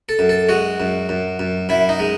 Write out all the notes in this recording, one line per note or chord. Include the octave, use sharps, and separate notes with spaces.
A4
F#2
A4
G#3 F#4
F#2
F#2
F#2
F#2 E4
D#4
G#3